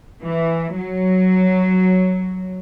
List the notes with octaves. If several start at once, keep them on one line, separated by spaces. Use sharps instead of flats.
E3
F#3